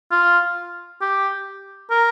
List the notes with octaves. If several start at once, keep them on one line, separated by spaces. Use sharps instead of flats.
F4
G4
A#4